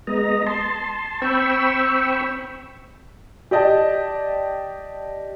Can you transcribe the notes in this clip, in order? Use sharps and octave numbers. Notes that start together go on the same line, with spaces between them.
G#3 B3 D#5 A#5
A5 C6
C4 G5 B5 C#6 E6
G4 D5 D#5 A5